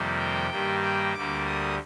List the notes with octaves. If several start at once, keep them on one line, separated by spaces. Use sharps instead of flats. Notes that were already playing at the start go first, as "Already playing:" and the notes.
Already playing: F2 C3 D#3 G3 A#3
G5
G2 D#3 G3 A#3
G5
D2 D3 G3 A#3 D6
D#6